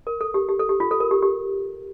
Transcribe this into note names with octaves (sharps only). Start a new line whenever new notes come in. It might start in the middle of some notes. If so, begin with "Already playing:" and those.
A#4
A4
G4
G4
A4
G4
F4
A4
A#4
G4
G4